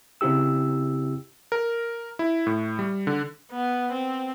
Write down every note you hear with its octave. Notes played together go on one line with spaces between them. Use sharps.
C#3 C4 E4 G4 E6
A#4
E4
A2
G3
D3
B3
C4